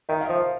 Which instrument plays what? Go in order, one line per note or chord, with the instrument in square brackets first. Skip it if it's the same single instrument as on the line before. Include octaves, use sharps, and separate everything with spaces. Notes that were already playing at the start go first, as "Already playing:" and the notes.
[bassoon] D#3 [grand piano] E5
[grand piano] F5
[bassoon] F3 [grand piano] E5